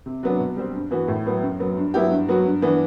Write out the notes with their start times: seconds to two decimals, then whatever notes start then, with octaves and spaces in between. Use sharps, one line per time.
0.06 C3
0.23 F#3 B3 D4
0.40 B2
0.57 G3 C4
0.74 G2
0.91 E3 B3 F#4
1.08 A2
1.26 F#3 B3
1.43 F#2
1.59 F#3 B3
1.77 G2
1.94 F#3 B3 E4 G4
2.11 G2
2.28 F#3 B3 F#4
2.45 G2
2.62 E3 B3 D4